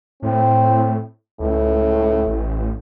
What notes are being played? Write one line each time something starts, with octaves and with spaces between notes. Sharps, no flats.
A2 C4
C#2 A2
A1